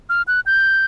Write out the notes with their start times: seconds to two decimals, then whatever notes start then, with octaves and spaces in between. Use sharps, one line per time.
0.09 F6
0.28 F#6
0.46 G6